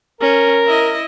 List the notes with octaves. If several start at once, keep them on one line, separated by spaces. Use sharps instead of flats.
C#4 A#4
E4 D#5